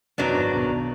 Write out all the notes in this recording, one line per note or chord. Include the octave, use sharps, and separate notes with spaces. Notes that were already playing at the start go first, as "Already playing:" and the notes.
F#2 D#3 F#3 B3 D4
A#2
G#1 G#2
B1 B2